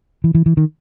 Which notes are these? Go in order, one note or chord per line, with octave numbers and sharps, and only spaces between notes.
E3
E3
E3
D#3